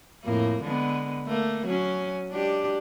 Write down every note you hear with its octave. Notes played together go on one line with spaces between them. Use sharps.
F2 A2 A#3
D3 G#3 B3
A3 A#3
F#3 C#4
G#3 D4 G4